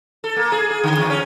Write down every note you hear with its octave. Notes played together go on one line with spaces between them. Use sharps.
A4
A#3
G#4
G#4
D3
E2
C#4